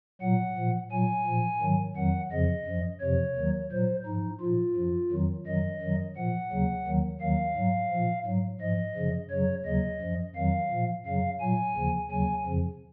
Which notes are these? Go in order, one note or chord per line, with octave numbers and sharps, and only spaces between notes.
A#2 F#3 F#5
A#2 F3
A#2 F#3 G#5
A#2 F3
G#2 D#3 F#3
F2 D#3 F#3 F#5
F2 C#3 F3 D#5
F#2 F3
F2 C3 F3 C#5
D#2 D#3 F#3
A#2 F#3 C5
G#2 F3 D#4
A#2 F3 F4
F#2 F3
F2 D#3 F#3
F#2 D#3 F#3 D#5
F#2 D#3 F#3
A#2 F3 F#5
D#2 C#3 F#3
D#2 D#3 F#3
D#2 D#3 F#3 F5
G#2 F#3
A#2 F3
G#2 F#3
G#2 F3 D#5
F#2 C#3 F3
F#2 C#3 F#3 C#5
D#2 C#3 F#3 D#5
F#2 F3
F2 D#3 F#3 F5
A#2 F3
F#2 C#3 F#3 F5
A#2 F#3 G#5
D#2 C#3 F3
D#2 C#3 F#3 G#5
F2 C#3 F3